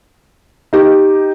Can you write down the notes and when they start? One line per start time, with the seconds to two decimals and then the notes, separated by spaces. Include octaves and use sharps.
0.73 D#4 G4